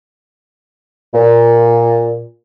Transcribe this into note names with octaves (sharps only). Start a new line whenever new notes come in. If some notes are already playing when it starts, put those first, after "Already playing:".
A#2